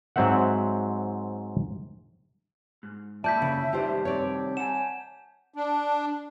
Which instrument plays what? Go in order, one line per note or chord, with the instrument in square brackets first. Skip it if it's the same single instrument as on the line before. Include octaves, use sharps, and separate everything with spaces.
[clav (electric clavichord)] G#2 F#3 C4 C5 E5 F#5
[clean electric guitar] G#2
[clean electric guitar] F#2 A#2 E4 [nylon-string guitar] D5 [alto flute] E5 [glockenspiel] A5 G6 B6
[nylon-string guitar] C#3
[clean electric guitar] C2 D#3 G3 [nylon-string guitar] G4 C5
[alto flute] C4 [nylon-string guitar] C#5 D5
[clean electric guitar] F#5 G#5 [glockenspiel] E7
[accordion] D4